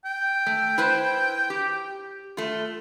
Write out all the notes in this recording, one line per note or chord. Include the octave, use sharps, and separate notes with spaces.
G5
A3
E4 B4 C5
G4
A3 F4